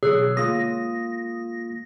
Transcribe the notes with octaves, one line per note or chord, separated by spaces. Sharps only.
B2 D3 F#3 G#4 C#5 E6 F#6
G#3 A#3 F4 D#6 A#6